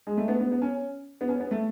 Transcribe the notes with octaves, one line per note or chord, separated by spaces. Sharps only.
G#3
A3
B3
B3
B3
C#4
B3
C#4
B3
A3